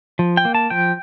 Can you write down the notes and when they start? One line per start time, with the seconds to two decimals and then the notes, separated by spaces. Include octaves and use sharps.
0.19 F3
0.37 G5
0.45 A#3
0.55 A5
0.70 F3 G5